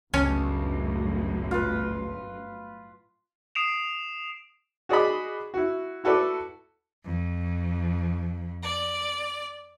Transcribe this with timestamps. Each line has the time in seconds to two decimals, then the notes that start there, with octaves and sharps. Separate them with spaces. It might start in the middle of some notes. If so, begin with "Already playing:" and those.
0.14 G1 C#2 F#2 A2 C#4 A5
1.51 F4 B4
3.55 D#6 C7 D7 E7 F7
4.89 F#4 G#4 D5 D#5 B5
5.54 E4 F#4
6.04 E4 F#4 A4 B4 D5
7.05 F2
8.63 D5